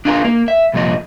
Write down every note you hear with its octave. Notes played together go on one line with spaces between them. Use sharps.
D4 D#4 F4 G#4 A#4
A#3
E5
C2 F2 A#2 F3 D#5